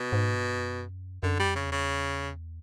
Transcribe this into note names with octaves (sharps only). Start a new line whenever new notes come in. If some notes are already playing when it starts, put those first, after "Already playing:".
Already playing: B2
G#2
G2
F#2
F#2 D3
G3
F2
C#3
E2
C#3